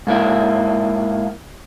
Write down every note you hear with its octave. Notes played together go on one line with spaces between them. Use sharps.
G#2 A#3 E4